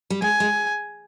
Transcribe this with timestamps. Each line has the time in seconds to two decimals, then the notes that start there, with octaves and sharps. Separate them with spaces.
0.10 G3
0.22 G#3 G#5
0.40 G#3